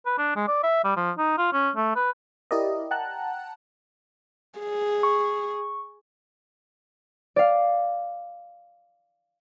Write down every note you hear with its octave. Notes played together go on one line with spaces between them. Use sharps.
B4
D4
G#3
D5
E5
G3
F3
D#4
F4
C#4
A3
B4
E4 G4 A#4 D5 D#5
F#5 G5 A5 A#5 F#6
G#4
C#6
D5 F5